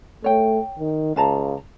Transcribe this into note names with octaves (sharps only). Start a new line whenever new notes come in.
A3 C#5 G5
D#3
C#2 F5 A5 A#5